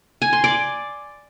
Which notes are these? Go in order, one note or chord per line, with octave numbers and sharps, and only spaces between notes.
G#5
C6
D5